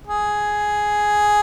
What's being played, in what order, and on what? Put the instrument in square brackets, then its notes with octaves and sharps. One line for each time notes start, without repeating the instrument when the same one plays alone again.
[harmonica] G#4